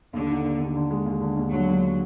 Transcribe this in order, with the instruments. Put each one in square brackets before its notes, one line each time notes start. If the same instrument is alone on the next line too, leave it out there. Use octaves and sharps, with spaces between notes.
[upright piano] D#2 [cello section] D3
[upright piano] D#4
D#2
D#2
D3
G#3
D#2
D3
D#2
[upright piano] D3 [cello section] F#3
[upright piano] D#2